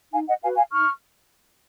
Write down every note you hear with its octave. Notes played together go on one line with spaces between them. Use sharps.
D#4 F5 G#5
D#5 F#5
F#4 B4 F5 G#5
F5 G#5
D#4 C#6 F6